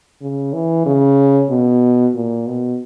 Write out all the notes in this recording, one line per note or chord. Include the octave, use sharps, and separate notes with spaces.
C#3
E3
C#3
B2
A#2
B2